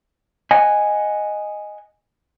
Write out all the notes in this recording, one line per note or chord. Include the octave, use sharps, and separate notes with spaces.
D#5 F#5 G#5